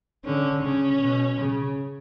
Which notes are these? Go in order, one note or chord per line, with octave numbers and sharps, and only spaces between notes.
D3 C#4
C#3 C#4
B2
C#3